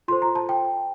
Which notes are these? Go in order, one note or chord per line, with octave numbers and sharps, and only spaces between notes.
F4 A4 C5 C6
A#5
A5
G5